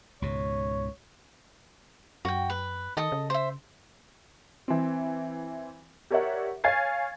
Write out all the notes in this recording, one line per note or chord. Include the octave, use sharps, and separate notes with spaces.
C#2 G#2 B2 C#5
F#2 F#4 G5
B4
D#3 A4 D#5 D#6
C#3
C5 E5
E3 C4
G4 A#4 C#5 D5 E5 F#5
C#5 F5 G#5 G#6 A6 C7